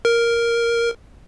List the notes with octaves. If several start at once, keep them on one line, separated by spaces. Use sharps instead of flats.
A#4